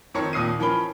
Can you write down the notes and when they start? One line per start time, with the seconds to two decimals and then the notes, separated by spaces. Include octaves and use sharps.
0.14 F2 D#3 C4 C#5 A#5 C#7
0.33 D#2 A#2 D#6 C7 D#7
0.59 E3 F3 C#4 A#4 B5 G7